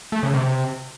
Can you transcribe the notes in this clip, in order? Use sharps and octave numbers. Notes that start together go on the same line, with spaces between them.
A3
C#3
C3